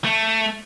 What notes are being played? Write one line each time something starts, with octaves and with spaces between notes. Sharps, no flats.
A3